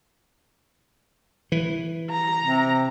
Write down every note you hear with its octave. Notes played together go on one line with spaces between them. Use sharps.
E3
A#5
C3